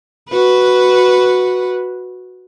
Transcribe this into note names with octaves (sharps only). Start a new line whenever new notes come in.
F#4 B4